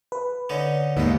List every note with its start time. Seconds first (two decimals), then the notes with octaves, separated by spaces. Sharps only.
0.12 B4
0.49 D3 C#4 D#4
0.97 D#2 G#2 B3 D#4